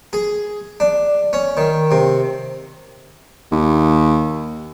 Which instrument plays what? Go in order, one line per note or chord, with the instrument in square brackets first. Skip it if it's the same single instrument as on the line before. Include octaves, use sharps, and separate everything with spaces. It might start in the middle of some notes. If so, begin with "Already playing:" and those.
[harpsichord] G#4
D4
C#4
D#3
C3
[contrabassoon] D#2